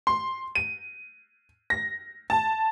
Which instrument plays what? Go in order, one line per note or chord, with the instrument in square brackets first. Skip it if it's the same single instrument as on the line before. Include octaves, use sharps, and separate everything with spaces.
[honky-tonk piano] C6
D#7
A#6
A5